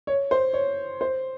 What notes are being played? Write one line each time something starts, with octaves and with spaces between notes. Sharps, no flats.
C#5
C5
C#5
C5